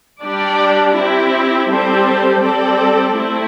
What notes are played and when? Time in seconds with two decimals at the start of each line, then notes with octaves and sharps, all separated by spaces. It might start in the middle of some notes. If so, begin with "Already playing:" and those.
0.21 G3 D4 G4 D5
0.95 C4 E4 G4
1.68 G3 C4 A4 C5
2.41 G3 C4 A4 D5
3.16 A3 C4 E4